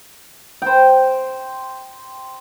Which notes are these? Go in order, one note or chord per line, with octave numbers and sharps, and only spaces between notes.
C5 G5